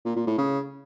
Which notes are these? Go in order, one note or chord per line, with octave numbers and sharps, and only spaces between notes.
A#2
A#2
A2
C#3